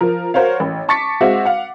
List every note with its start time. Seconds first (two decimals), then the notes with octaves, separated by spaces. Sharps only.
0.01 F3 A#4
0.34 F#4 A#4 C5 C#5 F5
0.60 A1
0.89 A5 C#6 D6 A6 B6 C#7
1.21 G#3 C4 F#4 E5 F5
1.45 F5 F#5